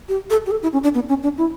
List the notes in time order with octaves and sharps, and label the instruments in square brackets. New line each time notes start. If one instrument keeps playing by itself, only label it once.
[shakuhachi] G4
A4
G4
A4
E4
C#4
D4
B3
C#4
D4
E4